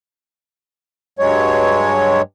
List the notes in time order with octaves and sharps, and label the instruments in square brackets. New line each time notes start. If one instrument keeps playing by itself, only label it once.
[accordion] G2 F#3 G#3 C#5